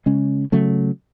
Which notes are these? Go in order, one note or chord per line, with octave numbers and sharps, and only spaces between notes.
C#3 G#3 C#4
C#3 F#3 A3